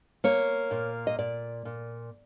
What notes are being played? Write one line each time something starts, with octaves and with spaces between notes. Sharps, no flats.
A#3 C#5
A#2
D#5
A#2 D5
A#2